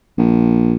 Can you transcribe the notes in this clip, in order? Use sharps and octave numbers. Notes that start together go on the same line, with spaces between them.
A#1